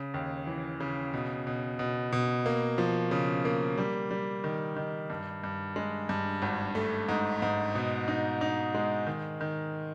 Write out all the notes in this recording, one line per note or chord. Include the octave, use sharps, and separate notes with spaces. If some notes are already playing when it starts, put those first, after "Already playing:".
Already playing: C#3
D#2
E3
C#3
B2
B2
B2
B2
A#3
F3
C#3
A#3
G3
G3
D#3
D#3
G2
G2
G#3
G2
G#1
A3
G#2
G#2
B2
D#4
D#4
G#3
D#3
D#3